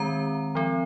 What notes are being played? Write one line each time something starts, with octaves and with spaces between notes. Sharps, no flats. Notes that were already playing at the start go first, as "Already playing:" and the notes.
Already playing: D#3 G#3 C4 A#5
F3 C4